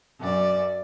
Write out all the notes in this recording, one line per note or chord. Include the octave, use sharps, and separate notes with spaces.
F#2 D5